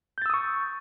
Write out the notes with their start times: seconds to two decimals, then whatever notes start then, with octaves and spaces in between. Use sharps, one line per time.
0.18 G6
0.22 A6
0.26 E6
0.30 D#6
0.34 C#6